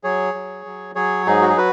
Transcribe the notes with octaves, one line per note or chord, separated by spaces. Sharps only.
F#3 G#4 C#5
F#3
F#3
F#3 G#4 C#5
G#2 D#4 G#4
F#4
G#4
F#4 B4